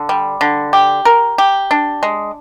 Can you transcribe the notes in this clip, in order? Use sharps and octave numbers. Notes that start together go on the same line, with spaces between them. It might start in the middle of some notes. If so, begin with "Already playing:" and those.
Already playing: D3
G3
D3
G4
A#4
G4
D4
G#3